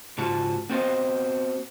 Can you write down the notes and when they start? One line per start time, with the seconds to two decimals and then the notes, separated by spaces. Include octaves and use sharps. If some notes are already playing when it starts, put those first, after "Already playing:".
0.18 G#2 C#3 F4 F#4 A5
0.70 B3 C4 F#4 C5 D#5 F5